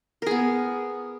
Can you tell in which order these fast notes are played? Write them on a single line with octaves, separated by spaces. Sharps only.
A#4 G#4 B3